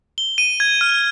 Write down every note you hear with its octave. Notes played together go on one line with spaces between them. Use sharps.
G7
D#7
G#6
F6